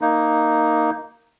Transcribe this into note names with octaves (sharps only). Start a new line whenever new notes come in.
A#3 D#4